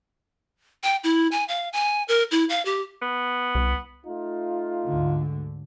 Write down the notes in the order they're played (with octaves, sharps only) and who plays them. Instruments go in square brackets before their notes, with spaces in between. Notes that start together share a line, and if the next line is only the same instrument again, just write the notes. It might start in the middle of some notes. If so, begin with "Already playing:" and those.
[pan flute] G5
E4
G#5
F5
G#5
A#4
E4
F5
G4
[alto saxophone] B3
[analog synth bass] C2
[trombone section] A3 D#4 F4
[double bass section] D2 G#2 D3